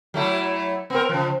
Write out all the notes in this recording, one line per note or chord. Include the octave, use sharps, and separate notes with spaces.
F#3 A3 E4
B3 C4 A#4
C#3 F3